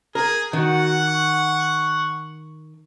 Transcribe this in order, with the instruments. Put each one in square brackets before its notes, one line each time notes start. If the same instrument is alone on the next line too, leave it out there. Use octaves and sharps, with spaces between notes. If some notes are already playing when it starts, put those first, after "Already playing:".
[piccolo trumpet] G#4 [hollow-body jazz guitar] A#4
[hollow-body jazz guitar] D#3 [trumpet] F#4 [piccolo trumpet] F#5
[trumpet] C#6